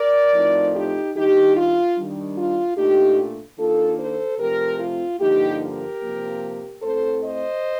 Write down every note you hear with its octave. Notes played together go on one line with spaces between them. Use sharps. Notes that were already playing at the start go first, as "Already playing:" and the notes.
Already playing: A#4 D5
A2 F3 A3 C4 D#4
D#4 G4
D#3 G3 D4 D#4 G4
F4
D#3 G3 D4
F4
A#2 A3 D4 D#4 G4
D#3 A#3 D4 F4 A4
A4 C5
C3 F3 A3 C4 G4 A#4
F4
G2 D3 F3 A#3 D#4 G4
G4 A#4
C3 F3 A#3
A2 A3 C4 A4 C5
C5 D#5